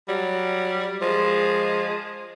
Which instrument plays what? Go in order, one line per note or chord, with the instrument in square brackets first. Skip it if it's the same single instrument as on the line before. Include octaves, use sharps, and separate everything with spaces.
[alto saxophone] F#3 [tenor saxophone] G3
[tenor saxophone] F3 [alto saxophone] G#3